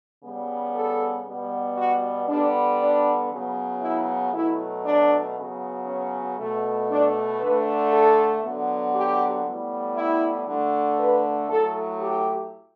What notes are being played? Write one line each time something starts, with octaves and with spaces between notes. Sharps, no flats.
C#3 G3 B3
A4
B2 G3 B3
F#4
D3 G3 B3 D4
D4
C#3 F#3 B3
E4
B2 F#3 A3 E4
D4
C#3 F#3 B3
C#4
B2 A3
D4
D3 A3 B4
A4
D3 F#3 B3
G4
A2 G3 B3
E4
D3 A3
B4
A2 F#3 A3 A4
G4